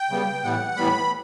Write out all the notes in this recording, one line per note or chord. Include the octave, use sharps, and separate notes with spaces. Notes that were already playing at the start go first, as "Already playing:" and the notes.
Already playing: G5
C#3 G3 B3
A2 E3 G3 B3 F#5
A2 E3 G3 B3 B5